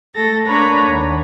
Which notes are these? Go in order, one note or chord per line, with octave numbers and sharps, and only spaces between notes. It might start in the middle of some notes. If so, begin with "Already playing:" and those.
A3 A4 A6 A#6
A#3 D4 B4 C#5 A#5 B5
D#2